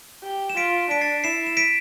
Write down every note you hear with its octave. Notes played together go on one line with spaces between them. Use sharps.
G4
E7
F4 B6 D7
D4 B6 D7
A6 C7
E4 C7 E7
E7
B6 D7